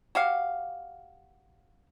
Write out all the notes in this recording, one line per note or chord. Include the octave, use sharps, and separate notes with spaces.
F#4 G4 F5